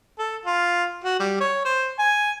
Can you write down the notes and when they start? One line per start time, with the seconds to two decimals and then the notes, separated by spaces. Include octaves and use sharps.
0.19 A4
0.45 F4
1.04 F#4
1.20 G3
1.40 C#5
1.65 C5
1.99 G#5